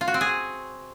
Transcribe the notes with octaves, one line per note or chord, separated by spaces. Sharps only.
F4
F#4
C4
G#4